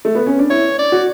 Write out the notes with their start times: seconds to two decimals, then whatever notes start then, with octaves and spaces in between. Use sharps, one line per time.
0.05 A3
0.15 B3
0.27 C#4
0.39 D4
0.50 E4 C#5
0.79 D5
0.92 F#4